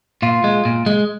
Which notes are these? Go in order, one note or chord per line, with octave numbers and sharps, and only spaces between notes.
A#2 F4
G#3
A#2
G#3